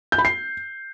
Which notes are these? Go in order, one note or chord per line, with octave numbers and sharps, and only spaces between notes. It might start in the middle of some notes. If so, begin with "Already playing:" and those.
G6
B5
C7